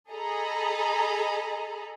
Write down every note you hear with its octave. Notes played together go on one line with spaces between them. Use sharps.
G#4 A4 D#5 A#5 B5